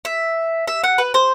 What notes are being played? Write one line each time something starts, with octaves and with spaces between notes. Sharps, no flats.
E5
E5
F#5
B4
C5